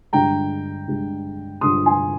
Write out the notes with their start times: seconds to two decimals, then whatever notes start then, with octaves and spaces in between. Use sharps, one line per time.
0.13 G2 D3 G#3 G5 A#5
0.88 G2 D3 G#3
1.61 G2 D3 G#3 C6 D#6
1.86 G#5 C6